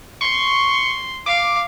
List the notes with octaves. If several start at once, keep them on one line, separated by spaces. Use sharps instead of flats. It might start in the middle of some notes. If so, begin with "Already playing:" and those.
C6 C#6
F5 D6